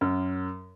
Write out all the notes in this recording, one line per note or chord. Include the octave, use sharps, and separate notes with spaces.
F#2